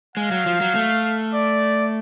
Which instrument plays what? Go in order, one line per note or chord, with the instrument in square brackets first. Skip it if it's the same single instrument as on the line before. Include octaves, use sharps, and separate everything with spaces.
[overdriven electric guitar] G#3 [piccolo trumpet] F5
[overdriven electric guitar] F#3
F3
F#3
A3
[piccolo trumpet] D5